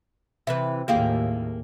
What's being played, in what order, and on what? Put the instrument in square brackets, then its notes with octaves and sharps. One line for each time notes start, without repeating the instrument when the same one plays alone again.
[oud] C3 E3 B4 [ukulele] E5
[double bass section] D#2 A2 [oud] A#3 G4 G#4 [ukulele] F4 F5 G5